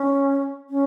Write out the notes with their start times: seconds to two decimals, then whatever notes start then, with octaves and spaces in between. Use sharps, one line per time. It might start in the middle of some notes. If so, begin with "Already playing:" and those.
Already playing: C#4
0.70 C#4